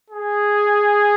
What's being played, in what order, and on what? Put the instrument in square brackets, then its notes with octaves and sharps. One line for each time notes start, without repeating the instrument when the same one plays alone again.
[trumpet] G#4